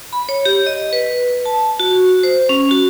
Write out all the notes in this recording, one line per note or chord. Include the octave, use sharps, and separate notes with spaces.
B5
C#5
G4
D#5
B4
A5
F#4
C5
C#4
F#4